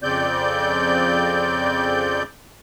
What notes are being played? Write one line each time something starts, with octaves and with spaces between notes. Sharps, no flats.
F2 C#3 C4 D5 G6